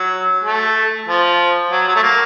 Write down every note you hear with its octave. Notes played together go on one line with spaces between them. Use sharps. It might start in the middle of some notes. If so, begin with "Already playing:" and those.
Already playing: F#3
A3
F3
F#3
F#3
A3
A#3